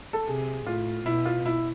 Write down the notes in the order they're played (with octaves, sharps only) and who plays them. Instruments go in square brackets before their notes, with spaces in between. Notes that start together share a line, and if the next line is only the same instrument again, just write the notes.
[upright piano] A4
[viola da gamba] C3 [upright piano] G#4
[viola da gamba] A2 [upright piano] F4
[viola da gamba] B2 [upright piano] E4
[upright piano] F4
E4